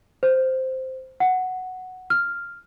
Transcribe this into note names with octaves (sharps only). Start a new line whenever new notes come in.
C5
F#5
F6